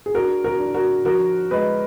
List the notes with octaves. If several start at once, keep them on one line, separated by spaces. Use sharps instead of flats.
G#4
D4 F#4 A#4
F#4 A#4
D4
F#4 A#4
F3 F#4 A#4
G#3 B4 D#5